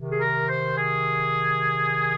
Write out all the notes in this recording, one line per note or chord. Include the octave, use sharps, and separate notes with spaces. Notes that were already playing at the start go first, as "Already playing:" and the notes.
Already playing: C3 D#3
G#4
A#4
C5
G#4